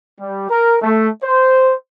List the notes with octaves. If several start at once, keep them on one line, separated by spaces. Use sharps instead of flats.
G3
A#4
A3
C5